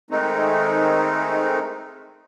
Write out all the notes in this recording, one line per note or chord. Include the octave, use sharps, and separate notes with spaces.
D#3 G#3 A3 C4 D#4